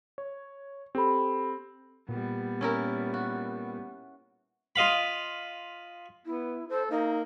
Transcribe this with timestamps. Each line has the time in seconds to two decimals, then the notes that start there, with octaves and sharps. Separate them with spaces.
0.18 C#5
0.95 C4 G4 A4 B5
2.09 A#2 G3 B3
2.61 C#4 E4 A#4
3.14 F#4
4.76 F4 D#5 F5 B5
6.26 B3 E4
6.69 A4 C5
6.90 A#3 D#4